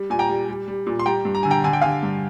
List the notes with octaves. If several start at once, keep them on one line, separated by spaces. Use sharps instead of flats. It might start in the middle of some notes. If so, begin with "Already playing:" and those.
Already playing: G3
A#2 G#5
G5 A#5
G3
G3
G3
A#2
C6
G3 G5 A#5
G2
A#5
D3 G#5
G5 A#5
D3 G#5
G5
D3 F5 G#5
G2